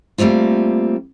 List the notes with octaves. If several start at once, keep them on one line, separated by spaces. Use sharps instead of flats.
G3 A3 A#3 C4 F4